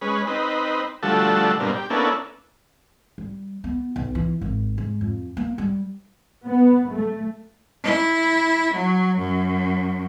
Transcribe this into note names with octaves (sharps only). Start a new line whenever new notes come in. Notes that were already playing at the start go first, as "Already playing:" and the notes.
G#3 C#4 B4
C4 D#4 B4
D3 F3 G3 A3 F#4 A4
G2 B2 A#3 C4 D4
G4
A#3 B3 C#4 D4 E4 A4
G3
B3
B1
E3
G#1
G#2
F2
A#3
G3
B3
A3
E4
F#3
F#2